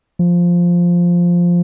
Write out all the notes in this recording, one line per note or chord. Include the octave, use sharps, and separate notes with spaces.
F3